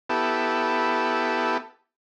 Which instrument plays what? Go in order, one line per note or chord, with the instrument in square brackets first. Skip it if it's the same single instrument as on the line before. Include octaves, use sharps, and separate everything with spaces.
[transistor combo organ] B3 E4 G4 A4